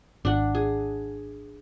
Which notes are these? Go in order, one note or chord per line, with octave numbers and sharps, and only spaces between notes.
G#1 D4 F#5
G#4